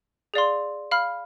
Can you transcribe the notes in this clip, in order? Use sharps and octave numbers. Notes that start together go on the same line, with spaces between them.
G#4 D5 F5 C6
F5 B5 F6